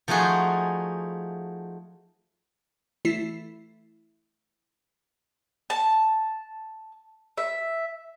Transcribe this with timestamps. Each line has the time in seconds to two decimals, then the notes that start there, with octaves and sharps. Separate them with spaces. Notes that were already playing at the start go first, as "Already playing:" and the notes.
0.08 F3 A3 D#4 F#4 G#4 C5
3.05 E3 A3 E4 B6 C7
5.70 A5
7.37 E5